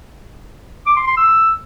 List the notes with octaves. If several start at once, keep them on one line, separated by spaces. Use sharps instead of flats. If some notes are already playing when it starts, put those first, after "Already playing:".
D6
C6
C6
E6